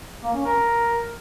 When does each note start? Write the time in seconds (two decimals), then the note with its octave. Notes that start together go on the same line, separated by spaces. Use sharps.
0.23 A#3
0.34 C#4
0.45 A#4